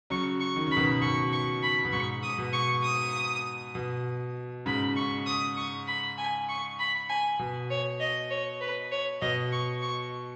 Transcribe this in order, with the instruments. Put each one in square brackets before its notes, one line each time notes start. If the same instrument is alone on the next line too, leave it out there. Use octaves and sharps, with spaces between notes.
[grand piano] C#3 F#3 [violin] C#6
[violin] C#6
[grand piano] D#3
[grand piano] C#3 [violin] B5
[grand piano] B2 D#3
[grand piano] B2 [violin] C#6
[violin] C#6
B5
[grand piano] B2
[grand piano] G#2 [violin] C#6
[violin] D#6
[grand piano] B2
[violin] C#6
D#6
[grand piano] B2
[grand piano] G#2 C#3 [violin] B5
[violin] C#6
D#6
C#6
B5
G#5
C#6
B5
G#5
[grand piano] B2
[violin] C#5
D#5
C#5
B4
C#5
[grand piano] B2 [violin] D#5
[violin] C#6
C#6